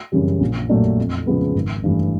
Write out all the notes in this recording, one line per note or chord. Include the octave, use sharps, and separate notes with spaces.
F#2 C#3 E3 G3
A#1
A#2 F#3 A3 D4
F2
C#3 F3 G#3 B3
G#1
G2 E3 A3